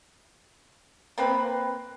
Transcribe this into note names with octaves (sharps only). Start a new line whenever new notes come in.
A#3 C4 B4